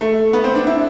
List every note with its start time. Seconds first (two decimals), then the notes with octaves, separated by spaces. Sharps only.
0.01 A3
0.33 B3
0.44 C4
0.55 D4
0.67 E4